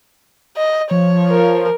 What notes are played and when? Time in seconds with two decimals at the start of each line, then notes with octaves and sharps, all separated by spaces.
0.57 D#5
0.91 F3 C#5
1.30 A#4